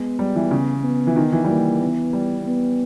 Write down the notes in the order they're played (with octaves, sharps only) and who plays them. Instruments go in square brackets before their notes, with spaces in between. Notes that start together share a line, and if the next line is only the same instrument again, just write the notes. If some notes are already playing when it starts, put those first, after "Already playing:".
Already playing: [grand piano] G#3 [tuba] B3
[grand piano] G3
E3
C#3
[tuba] B3
[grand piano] E3
D#3
E3
G3
[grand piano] E3 [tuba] A#3
[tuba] B3
[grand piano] G3
[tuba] B3